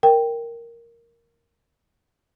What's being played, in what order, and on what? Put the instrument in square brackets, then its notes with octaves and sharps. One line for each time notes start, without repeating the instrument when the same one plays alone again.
[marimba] A#4 G5